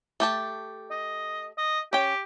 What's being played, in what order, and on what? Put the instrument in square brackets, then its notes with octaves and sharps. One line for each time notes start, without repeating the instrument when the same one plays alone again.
[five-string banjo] A3 G4 A5
[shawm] D#5
D#5
[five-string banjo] C#4 G5 [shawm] G4